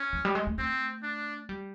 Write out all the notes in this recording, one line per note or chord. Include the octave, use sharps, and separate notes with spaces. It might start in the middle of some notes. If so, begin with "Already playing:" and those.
Already playing: C#4
F3
G3
G#3
A3
A3 C4
D4
G3